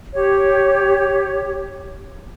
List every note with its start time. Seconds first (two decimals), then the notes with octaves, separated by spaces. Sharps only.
0.13 G4 C#5